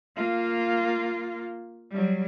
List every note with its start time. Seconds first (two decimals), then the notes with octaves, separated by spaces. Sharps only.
0.17 A#3 F4
1.91 F#3 G3